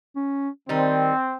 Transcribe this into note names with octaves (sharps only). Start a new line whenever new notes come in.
C#4
D#3 G3 C4 D#4